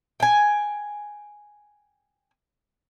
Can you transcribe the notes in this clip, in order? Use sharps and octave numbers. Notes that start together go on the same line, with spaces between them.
G5 G#5